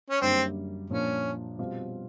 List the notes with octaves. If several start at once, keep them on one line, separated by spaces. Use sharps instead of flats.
C#4
F#2 D3 G3 A#3 C4
A#2 F3 A#3 C#4 D4
B2 G3 C4 F4